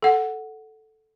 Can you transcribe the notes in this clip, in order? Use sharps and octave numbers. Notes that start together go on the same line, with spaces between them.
A4 F#5